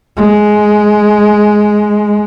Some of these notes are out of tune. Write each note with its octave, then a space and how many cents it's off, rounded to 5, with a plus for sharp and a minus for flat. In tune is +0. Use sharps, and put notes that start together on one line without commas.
G#3 +10